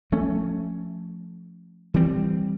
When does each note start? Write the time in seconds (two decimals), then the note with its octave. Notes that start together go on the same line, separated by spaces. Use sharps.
0.12 F3 A3 C#4
1.94 E3 G3 C4